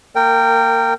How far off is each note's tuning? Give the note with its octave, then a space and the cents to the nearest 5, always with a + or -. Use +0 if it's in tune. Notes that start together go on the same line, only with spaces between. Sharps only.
A#3 -10 A#4 -25 G5 +0